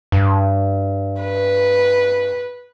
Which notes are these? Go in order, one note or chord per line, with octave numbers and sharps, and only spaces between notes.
G2
B4